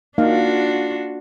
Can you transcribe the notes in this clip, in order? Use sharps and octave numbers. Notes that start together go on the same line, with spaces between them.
A#3 D4 D#4 F4 F#4 F5